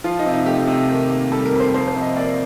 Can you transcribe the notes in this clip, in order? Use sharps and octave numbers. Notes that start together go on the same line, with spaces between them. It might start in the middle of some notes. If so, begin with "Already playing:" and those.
F3 F4
D#4
C3
D#4
A3 G4
C3
D#3
A#3
G3 A4
A#4
F2
C5
F3 C5
C5
C3
D#5
A#3 D5